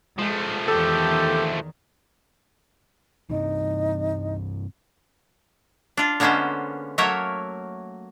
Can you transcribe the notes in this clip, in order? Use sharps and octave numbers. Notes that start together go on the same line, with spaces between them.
F3 G#3 A3
E2 D#3 G4 A4
G2 C3 E3 D#4
D4 F4
D3 G#3 A#3 B3 C#4 C5
F#3 A3 A#3 A#4 C#5 E5